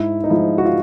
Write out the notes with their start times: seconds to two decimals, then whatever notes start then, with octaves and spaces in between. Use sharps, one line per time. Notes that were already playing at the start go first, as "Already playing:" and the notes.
Already playing: G#2 E4
0.24 D#4
0.30 F3 G#3 E4
0.58 F#4
0.65 F4